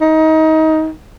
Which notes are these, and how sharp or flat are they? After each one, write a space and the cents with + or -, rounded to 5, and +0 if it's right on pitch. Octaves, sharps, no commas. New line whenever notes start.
D#4 +25